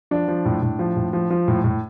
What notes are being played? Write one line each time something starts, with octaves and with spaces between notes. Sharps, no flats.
F3 D4
F3
A2
A2
F3
A2
F3
F3
A2
A2